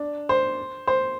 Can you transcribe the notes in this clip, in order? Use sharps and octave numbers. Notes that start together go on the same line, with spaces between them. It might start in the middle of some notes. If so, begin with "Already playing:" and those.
Already playing: D4
C5
C5